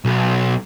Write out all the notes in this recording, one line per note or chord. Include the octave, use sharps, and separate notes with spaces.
B1